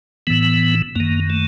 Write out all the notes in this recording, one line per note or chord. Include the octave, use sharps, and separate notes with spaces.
A2 E3 B3
F#2 D#3 A#3
A3